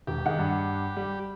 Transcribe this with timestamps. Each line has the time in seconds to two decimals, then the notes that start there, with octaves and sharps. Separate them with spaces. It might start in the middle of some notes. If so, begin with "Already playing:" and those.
0.07 E1 G4
0.26 D#3 G#4 F#5
0.39 G2
0.97 G3